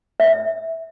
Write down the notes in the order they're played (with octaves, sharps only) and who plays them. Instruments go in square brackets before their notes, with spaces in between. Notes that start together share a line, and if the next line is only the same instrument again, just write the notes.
[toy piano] E5